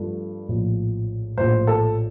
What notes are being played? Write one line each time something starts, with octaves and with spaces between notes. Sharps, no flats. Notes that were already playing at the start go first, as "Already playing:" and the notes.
Already playing: G2 F3 A3
A#1 A2 F3
A#1 A2 F3 C5
A4